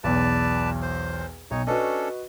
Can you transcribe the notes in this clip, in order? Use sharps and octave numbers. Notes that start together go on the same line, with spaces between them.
B1 E2 B4 D5 A5
C5
B1 D#4 C#5
C#4 D4 F#4 A4 B4 D#5